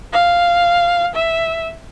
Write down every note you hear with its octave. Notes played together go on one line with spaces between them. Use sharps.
F5
E5